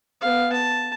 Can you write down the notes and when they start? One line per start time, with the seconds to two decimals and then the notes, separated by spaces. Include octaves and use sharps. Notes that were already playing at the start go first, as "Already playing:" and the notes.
0.21 B3 F5
0.52 A5